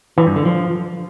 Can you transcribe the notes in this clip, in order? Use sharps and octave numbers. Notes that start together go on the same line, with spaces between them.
E3
G2
D3
F3